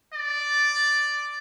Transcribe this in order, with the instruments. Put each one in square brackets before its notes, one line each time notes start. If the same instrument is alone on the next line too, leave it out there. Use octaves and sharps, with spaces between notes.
[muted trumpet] D5